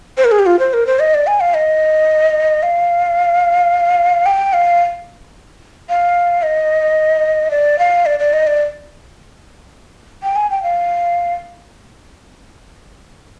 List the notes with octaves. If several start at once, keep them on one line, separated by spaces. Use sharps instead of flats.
C5
A#4
G#4
G4
F4
C5
A#4
C5
D#5
D5
G#5
F5
D#5
F5
G5
F5
F5
D#5
D5
F5
D5
D5
D#5
D5
G5
G#5
G5
F5